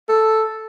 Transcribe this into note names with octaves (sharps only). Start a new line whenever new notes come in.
A4